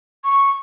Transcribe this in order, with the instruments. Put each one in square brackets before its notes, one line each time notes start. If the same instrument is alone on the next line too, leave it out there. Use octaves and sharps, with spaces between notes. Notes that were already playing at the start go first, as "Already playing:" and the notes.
[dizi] C#6